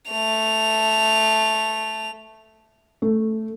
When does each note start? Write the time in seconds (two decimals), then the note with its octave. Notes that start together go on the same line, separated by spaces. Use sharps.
0.11 A3 F7
3.02 A3